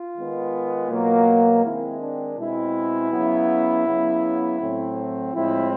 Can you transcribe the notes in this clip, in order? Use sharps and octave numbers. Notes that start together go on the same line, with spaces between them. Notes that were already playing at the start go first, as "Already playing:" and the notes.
Already playing: F4
D#3 G#3 B3
B2 F#3 A#3
D#3 G#3 C4 E4
D4
B2 G#3 C4 E4
C#3 F#3 B3
C#3 F#3 B3
A2 F#3 A3 C4
A2 F3 G#3 C4 E4